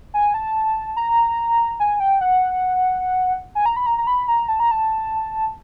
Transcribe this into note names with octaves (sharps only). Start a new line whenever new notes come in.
G#5
A5
A#5
G#5
G5
F#5
G#5
A#5
B5
A#5
A#5
B5
A#5
A5
A#5
A5